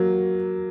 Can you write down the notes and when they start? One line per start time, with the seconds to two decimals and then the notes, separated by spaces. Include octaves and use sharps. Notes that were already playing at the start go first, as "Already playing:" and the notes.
Already playing: F#3 A#3